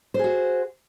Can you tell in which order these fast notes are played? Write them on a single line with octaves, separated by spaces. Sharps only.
C5 G#4 F#4